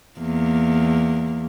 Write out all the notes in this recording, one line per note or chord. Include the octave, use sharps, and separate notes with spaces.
E2 A#3